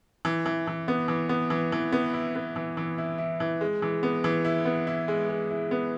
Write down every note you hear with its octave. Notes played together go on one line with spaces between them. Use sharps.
E3
E3
E3
B3
E3
B3
E3
E3
B3
E4
B3
E3
E3
E4
E4
E3
G#3
E3
B3
E3
E4
B3
E4
G#3
G#3
E4
B3